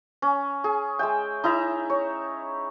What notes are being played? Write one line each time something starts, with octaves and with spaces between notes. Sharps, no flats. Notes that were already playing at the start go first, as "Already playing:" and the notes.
C#4
G#4
G#3 E5 G5
D#4 E4 E5 A#5
C#5